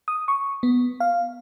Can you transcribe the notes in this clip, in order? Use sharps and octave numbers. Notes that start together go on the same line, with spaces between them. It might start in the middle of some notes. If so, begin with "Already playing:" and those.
D#6
C#6
B3
F5